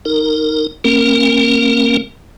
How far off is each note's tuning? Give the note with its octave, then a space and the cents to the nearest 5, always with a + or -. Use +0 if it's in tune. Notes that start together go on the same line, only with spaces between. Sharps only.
D#4 +0 A#4 -15
A#3 -25 C#4 -45 A#4 +0